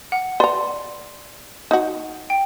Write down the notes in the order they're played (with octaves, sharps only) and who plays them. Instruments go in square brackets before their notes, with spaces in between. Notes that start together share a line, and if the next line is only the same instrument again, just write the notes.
[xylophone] F#5
[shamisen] B4 A#5 [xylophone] D5 C6
[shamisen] D#4 F#4
[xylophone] G5